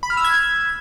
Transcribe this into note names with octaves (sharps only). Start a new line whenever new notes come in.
B5
F6
E6
G#6